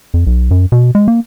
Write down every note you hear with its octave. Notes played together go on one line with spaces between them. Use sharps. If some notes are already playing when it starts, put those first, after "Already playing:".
F2
B1
F#2
B2
G#3
A#3